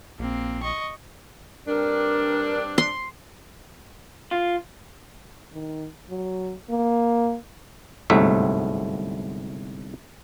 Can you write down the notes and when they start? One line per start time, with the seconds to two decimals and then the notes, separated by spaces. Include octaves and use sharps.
0.19 A#1 A#3 C4
0.63 D#5 C#6
1.68 G2 C4 D4 A#4
2.78 C6
4.31 F4
5.53 D#3
6.10 F#3
6.70 A#3
8.10 G1 C2 G#2 F#3 A3 E5